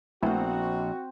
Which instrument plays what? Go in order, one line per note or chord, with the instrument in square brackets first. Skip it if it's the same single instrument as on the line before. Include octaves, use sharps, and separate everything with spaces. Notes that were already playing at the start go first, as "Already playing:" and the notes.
[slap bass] A#1 [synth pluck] A3 B3 E4 [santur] C4 C5 [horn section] F#4